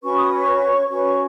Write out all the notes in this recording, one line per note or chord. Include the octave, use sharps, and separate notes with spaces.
C#4 F#4 B4 C#6
D#6
C#5 C#6
C#4 F#4 B4 C#5 C#6